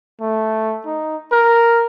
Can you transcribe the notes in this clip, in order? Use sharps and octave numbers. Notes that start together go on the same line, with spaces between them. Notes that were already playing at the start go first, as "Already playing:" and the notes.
A3
D#4
A#4